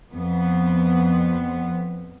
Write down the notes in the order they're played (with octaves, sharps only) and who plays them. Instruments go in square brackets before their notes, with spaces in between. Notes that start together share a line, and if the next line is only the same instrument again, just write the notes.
[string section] F2 B3